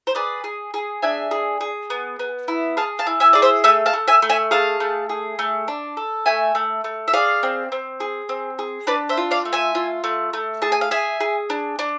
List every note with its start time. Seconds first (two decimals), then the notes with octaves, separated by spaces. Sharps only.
0.07 C5
0.15 G#4 B4 D5
0.44 G#4
0.74 G#4
1.02 D4 E5 G#5
1.31 G#4
1.61 G#4
1.90 B3
2.19 B3
2.48 E4
2.77 G#4 F5 A5
2.99 F5 A5
3.07 E4
3.20 E5 G#5
3.33 G#4 D5
3.42 C5 E5
3.64 A3 E5 G#5
3.86 F5 A5
3.93 A3
4.08 E5 G#5
4.22 A3
4.30 E5 G#5
4.51 G#4 F5 A5
4.80 A3
5.09 G#4
5.39 A3
5.68 D4
5.97 A4
6.26 A3 E5 G#5
6.55 A3
6.84 A3
7.08 E5
7.13 G#4 D5 F5
7.43 C4
7.72 C4
8.00 G#4
8.29 C4
8.59 G#4
8.87 D4 B4 D5
9.09 C5 E5
9.17 F4
9.31 D5 F5
9.45 A3
9.53 E5 G#5
9.75 F4
10.04 A3
10.33 A3
10.62 G#4 A5
10.72 G#5
10.81 F5
10.91 G#4 E5 G#5
11.20 G#4
11.50 D4
11.79 D4